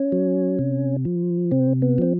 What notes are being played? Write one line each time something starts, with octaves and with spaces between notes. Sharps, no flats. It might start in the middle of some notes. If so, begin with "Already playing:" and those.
Already playing: C#4
F#3
C3
F3
C3 C4
B3
F3 C4